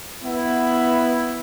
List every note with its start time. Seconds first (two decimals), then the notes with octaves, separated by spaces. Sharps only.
0.22 B3 E4